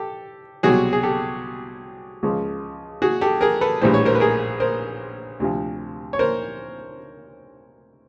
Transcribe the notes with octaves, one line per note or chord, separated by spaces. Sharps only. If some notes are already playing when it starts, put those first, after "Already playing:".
Already playing: G4 A4
C2 B2 F#3 F#4 G#4
G#4
G4 A4
C#2 C#3 F3
F#4 G#4
G4 A4
G#4 A#4
A4 B4
A#1 A2 E3 G3 C5
C#5
A#4 C5
B4
G#4 A#4
A#4 C5
D2 C3 F3
C#5
A#4 C5